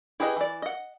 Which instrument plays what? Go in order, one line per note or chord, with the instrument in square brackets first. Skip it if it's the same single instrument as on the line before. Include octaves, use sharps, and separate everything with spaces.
[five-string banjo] E4 G4 G#4 B4 D#5
E3 D5
D#5 F#5